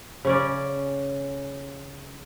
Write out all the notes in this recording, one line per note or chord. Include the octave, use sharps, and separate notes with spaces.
C#3 C#4 D5